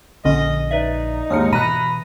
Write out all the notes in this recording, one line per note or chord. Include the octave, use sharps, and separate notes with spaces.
A#1 D3 C#4 D#5
D#4 B4 D5 E5
D#2 G#2 D#6 F6 C#7
B2 E3 A#5 B5 F#6 D#7